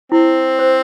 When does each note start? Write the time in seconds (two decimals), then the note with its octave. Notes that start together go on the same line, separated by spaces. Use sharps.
0.12 C4 E4
0.59 C5